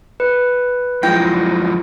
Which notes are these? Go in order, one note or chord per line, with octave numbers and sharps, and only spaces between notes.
B4
F#2 F3 G#3 E4 G5 A#6